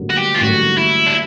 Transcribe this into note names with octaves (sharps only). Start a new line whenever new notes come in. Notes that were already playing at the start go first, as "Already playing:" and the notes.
Already playing: A1 G2 D3 F#3 A#3
F#4
G4
F4
A1 G2 D3 F#3 A#3 F#4
E4
D4